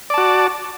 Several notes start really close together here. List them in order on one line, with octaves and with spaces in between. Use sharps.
D5 A5 F#4